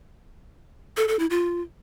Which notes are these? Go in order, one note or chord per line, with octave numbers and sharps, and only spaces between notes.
A4
A4
E4
F4